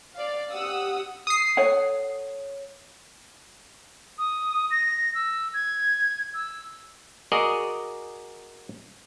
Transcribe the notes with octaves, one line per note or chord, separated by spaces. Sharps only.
D5 F5
G4 F#5 D#6 E6
D#6 C7
A4 C#5 F#5
D#6
A#6
E6
G#6
E6
F#4 G#4 A#4 D5 D#5